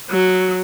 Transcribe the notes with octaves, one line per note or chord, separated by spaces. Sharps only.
F#3